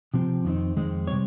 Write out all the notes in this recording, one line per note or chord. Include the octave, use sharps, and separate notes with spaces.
C3 F3 C4
F2 D#3 G#3 C4 D#4
F2 D#3 G#3 C4 D#4
C3 G3 C4 C#5